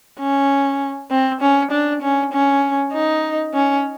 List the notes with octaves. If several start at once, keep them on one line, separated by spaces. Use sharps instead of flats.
C#4
C4
C#4
D4
C#4
C#4
D#4
C#4